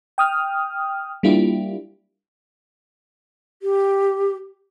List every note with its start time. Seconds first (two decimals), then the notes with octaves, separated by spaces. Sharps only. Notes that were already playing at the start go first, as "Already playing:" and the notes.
0.18 G5 D#6 F6
1.23 G3 A#3 D4 E4 F4 G4
3.62 G4